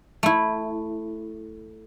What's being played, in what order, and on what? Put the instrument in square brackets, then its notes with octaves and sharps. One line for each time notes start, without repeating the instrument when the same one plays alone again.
[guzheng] A3 E4